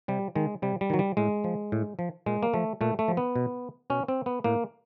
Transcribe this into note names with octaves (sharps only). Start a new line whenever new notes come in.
C3 G3
D#3 G#3
C3 G3
G3
D#3 F#3
G3
A2 G#3
F3
A2
F3
A#2 G#3
A#3
F3 A3
A#2 A3
A3
F3
B3
B2
B2 C#4
C4
B3
A2 A#3